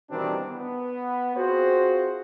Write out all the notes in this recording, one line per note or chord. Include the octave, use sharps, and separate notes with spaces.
B2 D#3 E3 G3 C4 D4
B3
C4 F4 F#4 G#4 C5